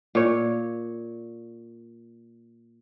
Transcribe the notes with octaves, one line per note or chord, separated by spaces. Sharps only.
A#2 C#5